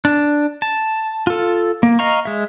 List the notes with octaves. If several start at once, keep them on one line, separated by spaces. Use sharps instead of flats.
D4
A5
F4 A4
A#3
D#5 F5 A#5 C#6
G#3 E5